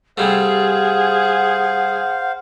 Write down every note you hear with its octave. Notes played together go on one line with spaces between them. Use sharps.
C3 G3 A3 G#4 C5 F5 F#5